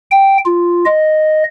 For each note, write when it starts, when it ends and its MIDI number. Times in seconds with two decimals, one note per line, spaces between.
0.11 0.38 79
0.45 0.85 65
0.86 1.44 75